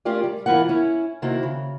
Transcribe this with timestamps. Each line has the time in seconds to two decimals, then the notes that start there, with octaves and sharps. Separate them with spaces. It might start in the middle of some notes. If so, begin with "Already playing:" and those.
0.05 A3 C#4 F4 G4 A#4 D5
0.24 G3
0.46 G#2 E3 E4 F4 A#4 F#5
0.69 C#4 E4 C#5
1.22 C3 D#3 A#3 E4 F#4
1.43 C#3